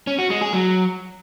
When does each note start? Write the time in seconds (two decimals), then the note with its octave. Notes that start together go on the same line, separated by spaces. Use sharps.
0.07 C#4
0.19 F#4
0.30 G#3
0.41 G#4
0.53 F#3